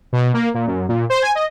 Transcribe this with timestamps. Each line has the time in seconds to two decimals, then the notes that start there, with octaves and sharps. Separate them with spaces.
0.13 B2
0.34 A#3
0.54 A#2
0.67 F#2
0.88 A#2
1.10 C5
1.22 G#5
1.35 D#5